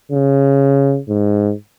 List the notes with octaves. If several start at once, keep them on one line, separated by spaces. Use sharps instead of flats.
C#3
G#2